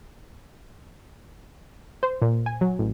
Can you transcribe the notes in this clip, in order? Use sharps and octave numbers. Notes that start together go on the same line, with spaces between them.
C5
A#2
G#5
F#3
A1